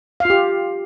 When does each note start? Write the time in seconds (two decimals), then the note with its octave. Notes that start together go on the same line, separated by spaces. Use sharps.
0.20 F5
0.25 F4
0.30 G4